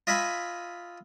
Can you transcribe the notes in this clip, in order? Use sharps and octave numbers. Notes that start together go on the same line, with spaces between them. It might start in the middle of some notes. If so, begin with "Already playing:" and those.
F4 D#5 E5 G#5 B5